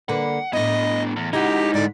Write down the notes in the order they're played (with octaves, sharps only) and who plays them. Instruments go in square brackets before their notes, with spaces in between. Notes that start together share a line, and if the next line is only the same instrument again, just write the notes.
[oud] D3 A#3 B4 [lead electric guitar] F#5
[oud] A2 E4 [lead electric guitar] B3 D4 [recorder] D#5
[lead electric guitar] E2
[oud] C#3 F#4 [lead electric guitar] G#3 E4 [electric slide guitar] D#4 [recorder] G4
[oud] G#2 D3 [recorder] D5